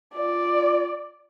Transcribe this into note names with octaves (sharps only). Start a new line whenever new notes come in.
F4 D5